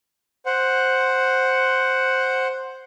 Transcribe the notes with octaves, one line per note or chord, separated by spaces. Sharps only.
C5 F#5